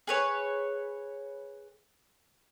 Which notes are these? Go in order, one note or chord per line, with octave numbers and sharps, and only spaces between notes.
G#4 B4 C#5